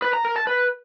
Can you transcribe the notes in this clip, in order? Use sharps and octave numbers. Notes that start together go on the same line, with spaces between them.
B4
A#5
A#4
A5
B4